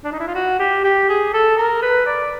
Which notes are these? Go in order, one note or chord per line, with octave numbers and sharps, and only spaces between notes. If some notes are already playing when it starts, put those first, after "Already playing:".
D4
D#4
E4
F4
F#4
G4
G4
G#4
A4
A#4
B4
D5